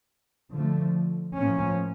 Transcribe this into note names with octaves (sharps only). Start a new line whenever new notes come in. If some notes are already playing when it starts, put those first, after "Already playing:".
D3 F3 A3
A2 F3 A#3 C#4